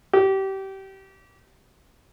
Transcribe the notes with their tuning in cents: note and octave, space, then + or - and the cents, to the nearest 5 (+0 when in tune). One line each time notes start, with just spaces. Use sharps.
G4 -25